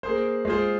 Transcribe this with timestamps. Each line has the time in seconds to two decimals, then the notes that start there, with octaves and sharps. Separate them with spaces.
0.03 A#3 G#4 C5
0.45 G#3 F4 G#4 C5